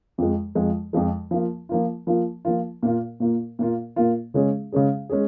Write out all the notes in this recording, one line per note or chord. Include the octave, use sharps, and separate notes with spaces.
F2 F3 G#3
F2 F3 G#3
F2 F3 G#3
F3 A#3 F4
F3 A#3 F4
F3 A#3 F4
F3 A#3 F4
A#2 A#3 F4
A#2 A#3 F4
A#2 A#3 F4
A#2 A#3 F4
C#3 G#3 C#4 G#4
C#3 G#3 C#4 G#4
G#3 C#4 G#4